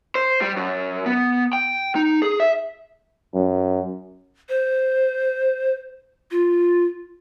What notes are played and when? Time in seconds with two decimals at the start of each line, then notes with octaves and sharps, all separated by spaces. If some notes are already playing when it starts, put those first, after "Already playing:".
0.15 C5
0.41 G3
0.57 F#2
1.06 B3
1.53 G5
1.95 D#4
2.22 G#4
2.40 E5
3.34 F#2
4.49 C5
6.31 F4